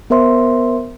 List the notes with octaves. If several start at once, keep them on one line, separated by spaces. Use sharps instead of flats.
B3 A#4 C5 E5 C6